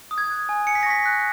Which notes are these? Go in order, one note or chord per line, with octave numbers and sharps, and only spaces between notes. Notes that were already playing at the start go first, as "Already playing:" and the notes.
D#6
G#6
F#6
G#5
G#5 C#7
B6
A#6
C#6 B6
F#6